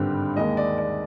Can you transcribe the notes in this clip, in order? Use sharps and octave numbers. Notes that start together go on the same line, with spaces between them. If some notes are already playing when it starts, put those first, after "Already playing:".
Already playing: G#1 G2 D3 G3 C4
D#2 D#3 G#3 D#5
D5
D5